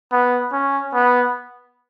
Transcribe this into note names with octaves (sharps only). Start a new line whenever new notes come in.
B3
C#4
B3